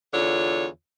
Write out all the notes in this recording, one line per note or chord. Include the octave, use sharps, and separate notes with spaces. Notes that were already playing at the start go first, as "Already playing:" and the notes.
E2 D3 F4 C#5